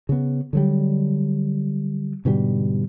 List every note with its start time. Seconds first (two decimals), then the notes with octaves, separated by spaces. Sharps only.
0.09 C#3 B3
0.53 D3 F#3 G3
2.25 G#2 B2 D3 G3